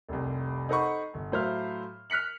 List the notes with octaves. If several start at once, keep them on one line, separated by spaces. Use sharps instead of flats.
F1 C2
D#4 A4 C5 F#5 B5 C#6
G1
A2 F#3 C5 E5 F5 F6
F6 F#6 B6 C#7 F#7